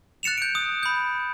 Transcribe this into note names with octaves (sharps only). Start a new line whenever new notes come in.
F#6 A6 C#7 E7 F7
G6 D7
D#6
B5 G6